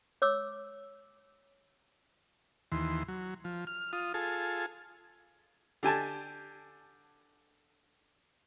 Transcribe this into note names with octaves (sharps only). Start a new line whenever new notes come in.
C#5 D6 E6
D#2 E3 C6
F#3
F3
F6
F4 D#6
F4 G#4 A4
D3 G4 G#5 A5